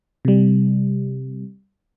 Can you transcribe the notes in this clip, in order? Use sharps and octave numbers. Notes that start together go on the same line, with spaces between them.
C3 G3